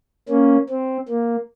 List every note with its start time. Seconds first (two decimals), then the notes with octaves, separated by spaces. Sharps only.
0.29 A#3 C#4
0.70 C4
1.09 A#3